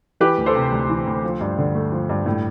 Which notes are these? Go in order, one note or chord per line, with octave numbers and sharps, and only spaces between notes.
E3 G4 B4
D2
A4 C5
C3
D2
E3
D2
F3
G2
D3
A3
F3
G2
A2